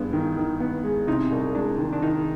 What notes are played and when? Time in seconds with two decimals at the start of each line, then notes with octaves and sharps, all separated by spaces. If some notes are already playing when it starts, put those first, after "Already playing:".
Already playing: G2 G#3 B3
0.13 D#3
0.37 D#3
0.60 B3
0.84 G#3
1.07 C3 D#4
1.32 C2
1.55 G#3 D4
1.78 D#3
1.93 D4
2.02 D#3 D#4